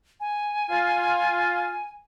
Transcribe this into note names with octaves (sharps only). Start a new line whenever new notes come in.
G#5
F4